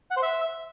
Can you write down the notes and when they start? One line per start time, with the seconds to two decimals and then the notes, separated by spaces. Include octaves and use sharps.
0.11 F#5
0.17 C5
0.22 E5